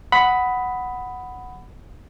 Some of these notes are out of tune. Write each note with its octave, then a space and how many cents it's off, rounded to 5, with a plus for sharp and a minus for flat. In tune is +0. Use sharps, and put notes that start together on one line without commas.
F#5 +0 B5 +5 D#6 +20